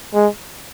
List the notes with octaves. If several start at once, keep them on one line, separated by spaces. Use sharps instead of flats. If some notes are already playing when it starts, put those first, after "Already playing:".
G#3